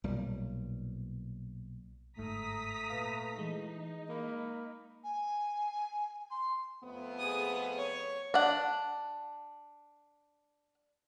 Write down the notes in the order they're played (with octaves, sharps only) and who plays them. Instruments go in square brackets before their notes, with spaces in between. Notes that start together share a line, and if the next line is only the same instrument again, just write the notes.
[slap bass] B1 A#2 G3
[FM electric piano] G1 G#2 [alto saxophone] A3 [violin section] A#5 D#6 B6
[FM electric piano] A#2 F5 [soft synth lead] B4
[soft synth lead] E3 [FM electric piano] G#3 [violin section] D#4
[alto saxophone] A#3 [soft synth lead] B5
[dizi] G#5
C6
[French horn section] F2 A3 B3
[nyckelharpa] G#4 D#6
C#5
[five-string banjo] D4 F#5